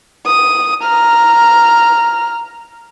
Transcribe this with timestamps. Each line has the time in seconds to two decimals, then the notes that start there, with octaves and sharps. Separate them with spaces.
0.27 D#6
0.83 A#5 F6